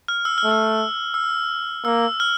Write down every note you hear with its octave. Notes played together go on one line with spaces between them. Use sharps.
F6
E6
F6
A3
E6
E6
A#3 E6
F6